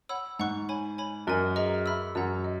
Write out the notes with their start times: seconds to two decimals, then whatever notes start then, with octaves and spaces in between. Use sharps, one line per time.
0.09 C#5 F#5 B5 E6
0.39 G#2 F#5 A#5 C#6 F#6
0.69 C#5 G#5 B5
0.98 C#5 G#5 B5
1.27 F#2 A#4 D#5 G#5
1.56 G#4 B4 D#5 A#5
1.86 E5 B5 E6
2.15 F#2 F#5 A#5 E6
2.44 D#5